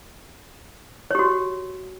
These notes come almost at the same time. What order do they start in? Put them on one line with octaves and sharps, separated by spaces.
C#5 G4 F#4